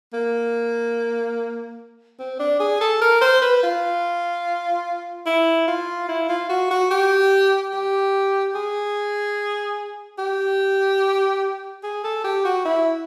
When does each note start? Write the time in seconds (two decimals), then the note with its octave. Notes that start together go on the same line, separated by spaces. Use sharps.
0.13 A#3
2.19 C4
2.39 D4
2.60 G#4
2.81 A4
3.01 A#4
3.21 C5
3.42 B4
3.63 F4
5.26 E4
5.68 F4
6.08 E4
6.29 F4
6.49 F#4
6.71 F#4
6.90 G4
7.73 G4
8.55 G#4
10.18 G4
11.83 G#4
12.04 A4
12.24 G4
12.44 F#4
12.65 E4